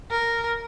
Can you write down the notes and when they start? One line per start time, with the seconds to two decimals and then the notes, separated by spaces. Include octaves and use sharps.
0.11 A#4